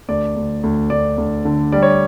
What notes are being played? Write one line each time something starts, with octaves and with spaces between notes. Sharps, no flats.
D2 D5
D2
D2
D2 D5
D2
D3
G3 D5
C#5